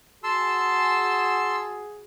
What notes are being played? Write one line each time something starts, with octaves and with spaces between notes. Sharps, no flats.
F#4 G#4 A5 C6 E6